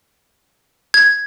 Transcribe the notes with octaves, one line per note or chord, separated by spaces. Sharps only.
G#6